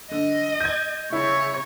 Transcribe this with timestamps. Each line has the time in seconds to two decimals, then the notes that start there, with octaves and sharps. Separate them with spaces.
0.11 D3 D#5
0.60 G6 G#6
1.12 C#3 E4 C#5